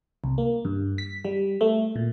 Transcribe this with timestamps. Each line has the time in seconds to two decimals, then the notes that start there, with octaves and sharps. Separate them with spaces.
0.24 C2
0.38 A#3
0.65 G2
0.98 B6
1.25 G3
1.61 A3
1.96 A#2